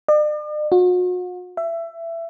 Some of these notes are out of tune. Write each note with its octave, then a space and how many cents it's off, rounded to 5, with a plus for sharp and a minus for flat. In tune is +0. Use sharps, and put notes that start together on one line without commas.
D5 +45
F#4 -40
E5 +20